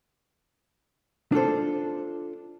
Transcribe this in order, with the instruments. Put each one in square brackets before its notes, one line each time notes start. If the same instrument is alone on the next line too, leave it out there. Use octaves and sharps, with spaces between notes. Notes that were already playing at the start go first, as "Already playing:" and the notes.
[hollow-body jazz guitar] D4 F4 A4 C5